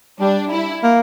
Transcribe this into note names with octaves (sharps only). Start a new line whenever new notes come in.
G3 D4
E4
A#3